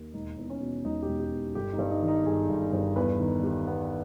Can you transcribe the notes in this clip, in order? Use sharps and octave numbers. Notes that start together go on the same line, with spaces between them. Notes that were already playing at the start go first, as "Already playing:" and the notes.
Already playing: D#2
E1 D#4
E2
C#4
B2
E1 D#4
G4
E1
G4
E2
G1 G4
D#4
G2
D#4
D#3
D#4
G1 G#4
G1
G2
E2 B4
D#3
G3
B3